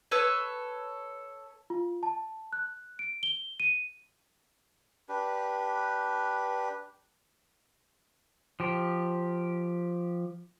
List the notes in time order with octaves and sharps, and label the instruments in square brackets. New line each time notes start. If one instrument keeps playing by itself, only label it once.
[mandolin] A4 B4 C#5 E6
[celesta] F4
A5
F#6
D7
G7
D#7
[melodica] D4 G4 B4
[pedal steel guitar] F3 G4